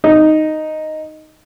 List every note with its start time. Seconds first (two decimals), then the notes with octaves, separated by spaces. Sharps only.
0.04 D#4